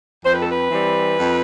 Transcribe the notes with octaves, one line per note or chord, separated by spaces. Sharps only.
F2 C5
B4
A4
B4
E3 G3 C4
F2